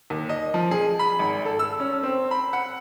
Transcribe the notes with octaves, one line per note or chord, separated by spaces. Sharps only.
D#2
D#5
F3
G#4
B5
G#1
A4
E6
C#4
C4
B5
F#5